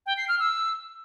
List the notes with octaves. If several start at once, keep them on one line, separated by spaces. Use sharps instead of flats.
G5
C7
F6
E6